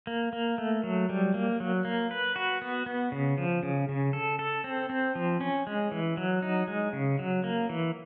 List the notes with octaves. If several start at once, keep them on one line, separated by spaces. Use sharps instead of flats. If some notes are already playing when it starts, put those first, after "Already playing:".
A#3
A#3
A3
F#3
G3
A#3
F#3
A#3
B4
F#4
B3
B3
C#3
F3
C#3
C#3
A4
A4
C4
C4
F3
C#4
G#3
E3
F#3
D#4
G#3
C#3
F#3
A#3
E3